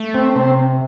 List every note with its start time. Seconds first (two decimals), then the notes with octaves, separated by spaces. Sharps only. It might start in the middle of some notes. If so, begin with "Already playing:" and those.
Already playing: A3
0.15 C4
0.36 C3 C4